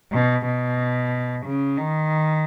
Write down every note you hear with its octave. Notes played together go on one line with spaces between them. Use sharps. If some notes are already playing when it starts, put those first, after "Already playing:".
B2
B2
C#3
D#3